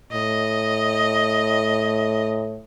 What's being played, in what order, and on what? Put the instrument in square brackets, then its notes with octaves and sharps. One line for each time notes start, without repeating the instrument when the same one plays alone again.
[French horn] A2 [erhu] D#5